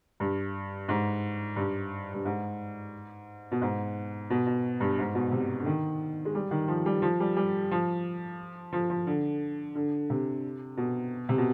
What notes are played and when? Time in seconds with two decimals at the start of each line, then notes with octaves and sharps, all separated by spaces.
0.20 G2
0.89 G#2
1.56 G2
2.14 G2
2.25 G#2
3.52 B2
3.62 G#2
4.30 B2
4.47 B2
4.80 G2
4.99 G#2
5.15 B2
5.31 C3
5.60 D3
5.66 D#3
6.25 G#3
6.35 G3
6.51 D#3
6.68 F3
6.86 G3
7.02 F3
7.20 G3
7.36 G3
7.71 F3
8.73 F3
8.90 F3
9.07 D3
9.75 D3
10.10 C3
10.77 B2
11.29 C3
11.38 B2